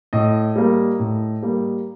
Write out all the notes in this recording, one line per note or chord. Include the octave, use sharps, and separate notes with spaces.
A2 D#5
G3 A#3
A2
G3 A#3